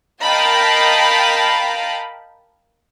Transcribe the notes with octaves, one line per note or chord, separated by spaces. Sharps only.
A#4 D#5 F5 G5 A5 B5